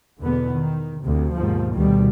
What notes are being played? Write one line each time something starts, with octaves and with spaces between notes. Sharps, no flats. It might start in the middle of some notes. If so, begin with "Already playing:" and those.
E2 B2 D3 B3
D#3
D2 C3
D#2 G#2 B2 F3
D2 B2 D#3 G3